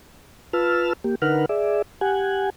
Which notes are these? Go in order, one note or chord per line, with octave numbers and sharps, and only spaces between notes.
F4 B4 A5 E6 F6
A#3 G4
D3 D#4 A#4 B4 F#5 F6
G#4 D5 E5
G4 F#5 G#5